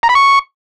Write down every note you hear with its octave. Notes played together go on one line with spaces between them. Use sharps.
A#5
B5
C#6